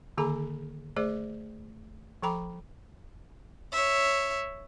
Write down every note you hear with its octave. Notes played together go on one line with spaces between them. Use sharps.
D3 D#3 A#3 G#4 A#5 B5
A3 G#4 C5 D5
F3 A4 G5 A#5 B5 D6
C#5 E5